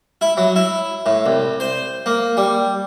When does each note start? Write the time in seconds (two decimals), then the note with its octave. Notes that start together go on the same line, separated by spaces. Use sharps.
0.21 E4
0.37 F#3
0.56 E4
1.06 A2
1.26 C2
1.60 C5
2.06 A#3
2.37 G3